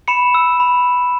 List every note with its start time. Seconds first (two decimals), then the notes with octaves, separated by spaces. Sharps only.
0.08 B5 C#7 E7
0.34 E6
0.60 B5